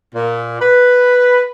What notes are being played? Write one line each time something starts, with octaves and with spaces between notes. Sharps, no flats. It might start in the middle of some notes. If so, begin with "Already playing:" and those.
A#2
B4